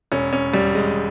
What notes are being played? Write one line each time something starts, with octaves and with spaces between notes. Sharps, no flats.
E1 C#4
C#4
E1 G3
G#3